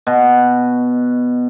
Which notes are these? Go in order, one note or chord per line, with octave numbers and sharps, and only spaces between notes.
B2